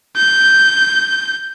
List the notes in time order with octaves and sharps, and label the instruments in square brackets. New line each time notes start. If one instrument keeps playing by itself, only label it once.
[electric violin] G6